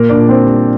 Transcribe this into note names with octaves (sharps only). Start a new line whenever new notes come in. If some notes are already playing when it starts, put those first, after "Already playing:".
Already playing: A#2 A#3 A#4
D4 D5
A#2
C4 C5
G3